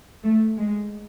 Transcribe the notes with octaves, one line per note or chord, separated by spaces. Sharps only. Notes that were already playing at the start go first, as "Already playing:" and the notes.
A3
G#3